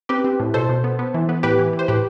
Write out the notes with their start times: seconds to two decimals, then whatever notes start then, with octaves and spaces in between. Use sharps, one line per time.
0.09 C4 G4 B4
0.24 C4
0.39 A2
0.54 B2 A4 C5
0.69 B2
0.84 B3
0.99 B3
1.14 E3
1.29 B3
1.43 A2 G4 B4
1.59 E3
1.73 E3
1.79 C5
1.88 A2 G4 B4